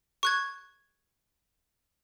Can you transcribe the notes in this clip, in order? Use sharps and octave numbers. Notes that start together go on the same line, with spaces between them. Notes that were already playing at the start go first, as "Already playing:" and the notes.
C#6 F#6 G#6